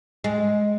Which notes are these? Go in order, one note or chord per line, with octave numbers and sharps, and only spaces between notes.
G#3